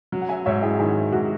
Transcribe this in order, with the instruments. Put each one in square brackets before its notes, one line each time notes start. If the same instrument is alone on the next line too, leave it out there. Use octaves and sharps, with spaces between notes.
[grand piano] F#3
[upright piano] F#5
E5 G#5
[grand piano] G#2 [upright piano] C#5 E5
[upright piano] E4 G#4
[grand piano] D#3 [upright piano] E4 G#4
[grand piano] G#2 [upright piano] F#4